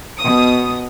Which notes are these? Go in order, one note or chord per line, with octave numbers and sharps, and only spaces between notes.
B2 D#6